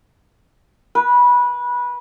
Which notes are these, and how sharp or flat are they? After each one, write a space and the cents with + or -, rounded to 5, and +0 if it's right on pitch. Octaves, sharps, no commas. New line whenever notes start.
B4 -20